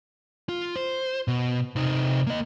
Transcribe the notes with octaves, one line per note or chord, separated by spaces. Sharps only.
F4
C5
B2
C3 D#4
A#3 D#5